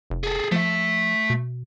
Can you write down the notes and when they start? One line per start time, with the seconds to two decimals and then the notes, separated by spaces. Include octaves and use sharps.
0.10 F1
0.24 G#4 A4
0.52 F3 A3 E5
1.30 B2